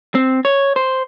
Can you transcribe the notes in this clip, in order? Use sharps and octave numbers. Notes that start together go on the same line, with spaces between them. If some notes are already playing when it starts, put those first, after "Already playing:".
C4
C#5
C5